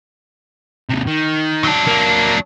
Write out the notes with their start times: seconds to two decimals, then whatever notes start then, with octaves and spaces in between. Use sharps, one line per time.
0.89 D#2 C3
1.07 D#3
1.64 F#3 D4
1.87 A#3